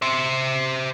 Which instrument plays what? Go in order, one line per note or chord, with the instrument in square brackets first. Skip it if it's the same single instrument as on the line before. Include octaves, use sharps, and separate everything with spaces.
[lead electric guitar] C5 E5